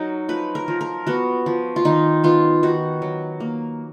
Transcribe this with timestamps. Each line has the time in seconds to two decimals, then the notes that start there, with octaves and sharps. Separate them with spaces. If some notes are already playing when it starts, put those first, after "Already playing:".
Already playing: F#3 D#4 A#4
0.29 F3 B4
0.55 A#4
0.68 F3
0.81 A#4
1.07 B3 F#4
1.46 F3
1.76 F4
1.85 D#3 D#4
2.24 B3 F4
2.63 D#3 F#4
3.02 F#3
3.40 A#3